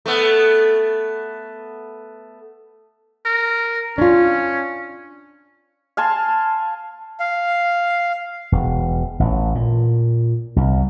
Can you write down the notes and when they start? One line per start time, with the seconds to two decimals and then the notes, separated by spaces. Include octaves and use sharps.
0.06 A3 B3
3.26 A#4
3.98 C#4 D4 F4
5.97 F5 G#5 A5 C6
7.20 F5
8.52 E1
9.20 A1
9.55 A#2
10.56 C2